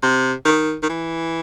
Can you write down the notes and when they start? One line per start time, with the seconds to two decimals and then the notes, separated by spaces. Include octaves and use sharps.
0.03 C3
0.45 D#3
0.83 D#3
0.89 E3